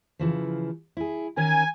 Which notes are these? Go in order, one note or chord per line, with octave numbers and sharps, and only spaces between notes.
C#3 E3 F3
E4 G#4
D#3 C#4 A#4 G#5